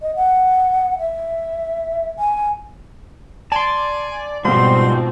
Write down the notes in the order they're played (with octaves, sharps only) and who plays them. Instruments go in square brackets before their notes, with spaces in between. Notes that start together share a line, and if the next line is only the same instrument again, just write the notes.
[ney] D#5
F#5
E5
G#5
[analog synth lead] D5 [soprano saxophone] G#5 [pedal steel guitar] A5 C6
[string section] G#2 B2 C4 [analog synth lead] F3 [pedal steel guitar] G3 F#4 [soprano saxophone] C6